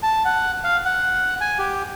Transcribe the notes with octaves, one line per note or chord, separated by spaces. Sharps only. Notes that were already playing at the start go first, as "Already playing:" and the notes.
A5
F#5
F5
F#5
G#5
G4